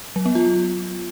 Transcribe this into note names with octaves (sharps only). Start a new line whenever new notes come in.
F#3
B3
F4